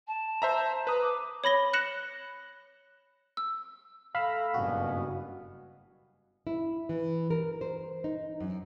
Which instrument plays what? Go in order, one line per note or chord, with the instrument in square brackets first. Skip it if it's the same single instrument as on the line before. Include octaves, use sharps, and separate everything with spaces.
[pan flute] A5
[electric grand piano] C5 E5 A#5
[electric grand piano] B4 D#6 [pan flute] A#5
[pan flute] D6
[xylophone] C#5 B5 A#6 G7
F#6 A#6 C#7 E7 F#7
E6
[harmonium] A3 A#5 [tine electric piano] F5 [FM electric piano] B5 E6
[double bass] F#1 G2 [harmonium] B2 B3 C#4 [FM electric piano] F#4
[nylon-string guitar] E4
E3
A#4
C5
D#4
F#2